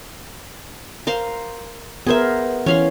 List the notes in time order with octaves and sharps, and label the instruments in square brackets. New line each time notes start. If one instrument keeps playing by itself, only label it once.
[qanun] A#4 C5 F5
[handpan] B3 A#4 [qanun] G#4 C5 E5
[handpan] E3 [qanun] C#4 F5 C6